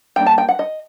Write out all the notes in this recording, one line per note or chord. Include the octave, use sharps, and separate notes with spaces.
G3 A#3 D4 G5
A5
G5
F#5
D#5